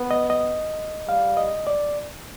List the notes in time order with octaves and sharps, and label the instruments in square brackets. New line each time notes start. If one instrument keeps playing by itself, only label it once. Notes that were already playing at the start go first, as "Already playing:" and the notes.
Already playing: [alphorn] B3
[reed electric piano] D#5
D#5
[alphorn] G3 [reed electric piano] F5
[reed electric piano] D#5
D5